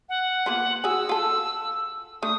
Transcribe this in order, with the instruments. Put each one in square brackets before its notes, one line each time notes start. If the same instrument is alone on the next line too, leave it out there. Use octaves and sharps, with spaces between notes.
[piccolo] F#5
[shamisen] A#3 B3 F4
[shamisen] F#4 G#4 [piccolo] E6
[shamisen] F4 A4
[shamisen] A3 D4 [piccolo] D#6